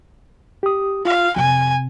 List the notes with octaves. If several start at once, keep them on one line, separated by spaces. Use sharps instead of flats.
G4 D#6
F4 F5
F2 C3 G#5